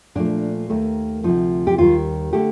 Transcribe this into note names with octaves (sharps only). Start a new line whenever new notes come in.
A#2 F3 A3 D4
D#2 D#3 A3
D2 C3 F3 D#4
G4
D#2 D#3 G3 F4
D3 A3 G4